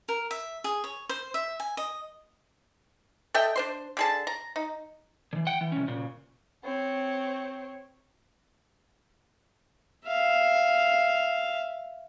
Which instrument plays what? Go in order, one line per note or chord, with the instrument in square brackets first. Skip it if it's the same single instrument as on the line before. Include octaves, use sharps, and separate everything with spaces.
[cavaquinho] A#4
E5
G#4
C#5
C5
E5
G#5
D#5
[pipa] A4 D#5 E5 G5
D4 C5 C6
D3 G#4 A5
A#5
D#4
[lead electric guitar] D3 E3
F#5 G5
E3
C2 C#4
A#2 C#3
[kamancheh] C4 C#5
[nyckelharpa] E5 F5